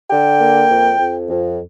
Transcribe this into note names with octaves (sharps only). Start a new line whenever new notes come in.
D3 G5
A#3
F2
F2
F2